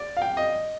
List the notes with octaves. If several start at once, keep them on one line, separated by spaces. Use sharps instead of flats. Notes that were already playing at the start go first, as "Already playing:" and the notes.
Already playing: D5
F5
G5
D#5